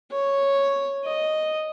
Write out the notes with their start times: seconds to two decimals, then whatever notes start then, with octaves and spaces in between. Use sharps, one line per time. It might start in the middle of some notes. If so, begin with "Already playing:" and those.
0.11 C#5
1.05 D#5